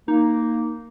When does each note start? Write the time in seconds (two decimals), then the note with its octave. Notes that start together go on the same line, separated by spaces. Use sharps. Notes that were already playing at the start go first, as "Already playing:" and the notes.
0.08 A#3 D#4